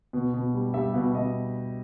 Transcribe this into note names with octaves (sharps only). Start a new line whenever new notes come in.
B2
B2
G3
G3 E5
B2 E5
B2 D#5